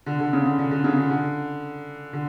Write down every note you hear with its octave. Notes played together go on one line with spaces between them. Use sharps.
D3
D3
C#3
D3
D3
D3
C#3
D3
D3
D3